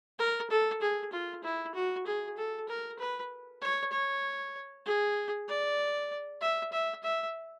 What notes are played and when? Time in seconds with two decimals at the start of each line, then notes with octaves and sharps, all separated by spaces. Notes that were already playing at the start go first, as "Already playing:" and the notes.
0.19 A#4
0.50 A4
0.81 G#4
1.12 F4
1.44 E4
1.75 F#4
2.06 G#4
2.37 A4
2.68 A#4
2.99 B4
3.61 C#5
3.92 C#5
4.86 G#4
5.48 D5
6.41 E5
6.72 E5
7.03 E5